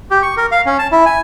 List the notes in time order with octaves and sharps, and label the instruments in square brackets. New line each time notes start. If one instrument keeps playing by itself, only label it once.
[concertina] G4
C#6
A#4
F5
C#4
A5
E4
G#5